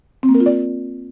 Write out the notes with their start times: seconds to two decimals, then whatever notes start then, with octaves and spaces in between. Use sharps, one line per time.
0.23 C4
0.29 A#3
0.35 A#4
0.40 F4
0.46 D5